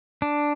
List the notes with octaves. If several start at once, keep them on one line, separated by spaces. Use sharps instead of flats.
D4